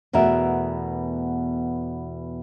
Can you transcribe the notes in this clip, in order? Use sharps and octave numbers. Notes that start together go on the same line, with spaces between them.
E2 B2 A3 A#4 E5